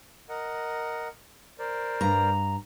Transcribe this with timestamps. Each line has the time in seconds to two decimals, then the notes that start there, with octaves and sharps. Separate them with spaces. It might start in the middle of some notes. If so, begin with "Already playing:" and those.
0.29 A#4 D#5 F#5
1.59 A#4 C5 D5
2.01 G2 A#5